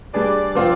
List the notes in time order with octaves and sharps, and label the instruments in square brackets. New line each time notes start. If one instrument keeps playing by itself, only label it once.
[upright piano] G3 D4 G#4 B4 [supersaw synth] D5
[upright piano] F3 C4 F4